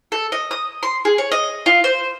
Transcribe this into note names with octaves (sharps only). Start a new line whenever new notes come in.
A4
D#5
D#6
C6
G#4
C#5
D#5
F4
C5